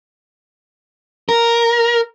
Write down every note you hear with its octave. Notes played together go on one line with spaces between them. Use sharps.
A#4